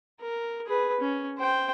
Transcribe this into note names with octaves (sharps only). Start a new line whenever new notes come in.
A#4
G#4 B4
C#4
C5 G5